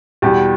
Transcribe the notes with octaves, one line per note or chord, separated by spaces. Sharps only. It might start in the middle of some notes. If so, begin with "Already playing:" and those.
E2 B2 G3 G4